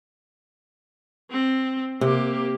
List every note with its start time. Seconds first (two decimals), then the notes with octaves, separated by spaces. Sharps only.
1.31 C4
2.01 C3 A#3 G4